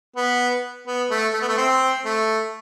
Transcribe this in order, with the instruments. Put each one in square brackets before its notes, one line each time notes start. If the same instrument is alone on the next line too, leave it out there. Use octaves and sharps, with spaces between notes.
[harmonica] B3
B3
A3
A3
B3
A3
C4
A3